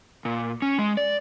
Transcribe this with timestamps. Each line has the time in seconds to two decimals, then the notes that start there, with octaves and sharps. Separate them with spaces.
0.25 A#2
0.62 C#4
0.79 G#3
0.97 D5